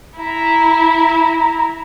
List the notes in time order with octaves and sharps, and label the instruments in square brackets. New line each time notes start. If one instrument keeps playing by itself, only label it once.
[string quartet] E4 [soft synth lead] A#5